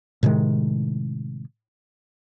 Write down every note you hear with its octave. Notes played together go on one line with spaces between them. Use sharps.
A2 C3 D#3 G#3